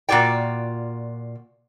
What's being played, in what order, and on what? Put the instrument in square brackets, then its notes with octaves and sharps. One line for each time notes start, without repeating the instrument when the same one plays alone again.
[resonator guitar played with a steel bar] A#2 F4 F#4 D5 G5